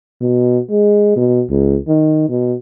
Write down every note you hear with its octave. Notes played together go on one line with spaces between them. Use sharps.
B2
G#3
B2
C#2
D#3
B2